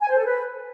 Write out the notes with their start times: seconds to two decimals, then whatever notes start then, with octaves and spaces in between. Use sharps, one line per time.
0.02 G#5
0.10 C5
0.18 A4
0.26 B4